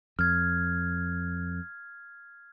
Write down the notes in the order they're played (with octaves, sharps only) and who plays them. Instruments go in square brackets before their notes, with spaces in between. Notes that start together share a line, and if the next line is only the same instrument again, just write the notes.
[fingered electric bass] F2 [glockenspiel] F6 G#6